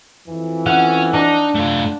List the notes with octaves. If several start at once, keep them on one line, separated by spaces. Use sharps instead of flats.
F2 E3
C#4 F#5
D4 D#4
A3 F4